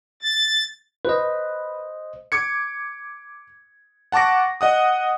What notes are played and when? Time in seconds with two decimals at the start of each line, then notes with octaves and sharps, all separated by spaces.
0.22 A6
1.05 B4 C5 D#5
2.32 D6 G#6 C#7
4.12 F#5 A5 C#6 D6 A#6
4.61 D#5 F#5 D#6